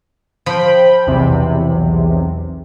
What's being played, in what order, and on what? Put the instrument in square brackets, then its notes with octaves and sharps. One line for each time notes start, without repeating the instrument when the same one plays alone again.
[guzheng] F3 [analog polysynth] G5 B5
[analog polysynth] B1 E2 C3